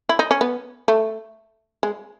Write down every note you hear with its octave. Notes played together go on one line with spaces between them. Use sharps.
E4
D#4
C#4
B3
A3
G#3